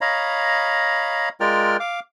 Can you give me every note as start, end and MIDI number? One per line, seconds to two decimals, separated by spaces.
0.01 1.29 73
0.01 1.29 75
0.01 1.29 77
0.01 1.29 82
0.01 1.29 83
1.40 1.77 56
1.40 1.77 65
1.40 1.77 70
1.40 1.77 74
1.40 1.77 79
1.40 1.77 89
1.80 2.00 77
1.80 2.00 86